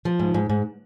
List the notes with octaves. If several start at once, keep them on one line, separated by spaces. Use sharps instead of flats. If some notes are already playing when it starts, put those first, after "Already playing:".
F3
G#2
G#2
G#2